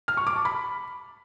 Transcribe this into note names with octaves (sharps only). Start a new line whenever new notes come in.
F6
C#6
D6
A5
B5